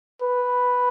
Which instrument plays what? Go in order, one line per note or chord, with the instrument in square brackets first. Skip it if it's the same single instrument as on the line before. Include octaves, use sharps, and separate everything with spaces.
[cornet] B4